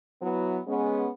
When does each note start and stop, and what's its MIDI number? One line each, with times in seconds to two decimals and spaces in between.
0.21 0.59 54
0.21 0.59 59
0.21 0.59 64
0.67 1.07 56
0.67 1.07 59
0.67 1.07 61